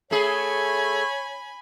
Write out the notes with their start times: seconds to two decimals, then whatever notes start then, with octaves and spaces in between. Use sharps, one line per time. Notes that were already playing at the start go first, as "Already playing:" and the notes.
0.11 A3 G#4 C#5 G#5 B5